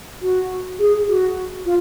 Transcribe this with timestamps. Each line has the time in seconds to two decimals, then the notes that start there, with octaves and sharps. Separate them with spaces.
0.22 F#4
0.79 G#4
1.08 F#4
1.65 F4